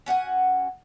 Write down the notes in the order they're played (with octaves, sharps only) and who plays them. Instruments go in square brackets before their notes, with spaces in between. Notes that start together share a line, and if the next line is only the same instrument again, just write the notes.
[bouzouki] C#4 F#4 F#5 G#5